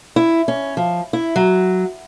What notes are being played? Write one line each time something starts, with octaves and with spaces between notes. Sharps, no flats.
E4
C#4
F3
E4
F#3